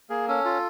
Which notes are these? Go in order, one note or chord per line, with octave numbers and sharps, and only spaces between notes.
A#3 G#4
C#4 A4
F4